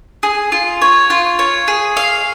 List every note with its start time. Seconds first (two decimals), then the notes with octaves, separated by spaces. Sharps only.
0.23 G#4
0.52 F4
0.82 C#5
1.10 F4
1.39 C#5
1.68 G#4
1.97 F5